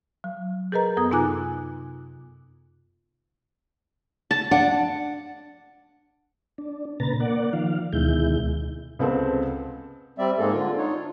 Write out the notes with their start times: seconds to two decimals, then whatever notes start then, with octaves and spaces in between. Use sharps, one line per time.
0.24 F#3
0.72 G#4 A#4 B4 D#5 A#5
0.97 F#2 B3 A4 D#6
1.11 C3 D#4 F4 G#5 D6 F#6
4.31 A5
4.51 D4 F#5
6.58 D4
7.00 A#2 C#3 B4 A#5 A6
7.20 A#3 D5 F#5
7.53 D#3 F3 F5
7.93 D2 B2 D#3 G#3 E4 G6
8.99 C#2 B3 C4 A4 C5
10.18 G3 C4 D5 E5
10.38 G#2 G#3 A#3 C4 A4
10.53 D3 F4
10.78 D4 D#4 C#5
10.94 F4